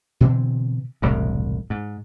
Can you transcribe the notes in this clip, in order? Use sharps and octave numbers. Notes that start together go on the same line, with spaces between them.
B2 D3 E3 C4
E1 C2 A2
G#2